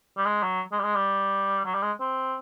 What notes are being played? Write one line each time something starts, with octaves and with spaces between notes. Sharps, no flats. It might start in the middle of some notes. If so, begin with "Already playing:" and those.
G3
G#3
F#3
G#3
G3
G#3
G3
F#3
G3
G#3
C4